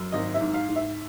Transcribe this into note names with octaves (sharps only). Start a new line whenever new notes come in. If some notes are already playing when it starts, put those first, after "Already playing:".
Already playing: F#2
G#1 D#5
E5
G#2
F5
G#2
E5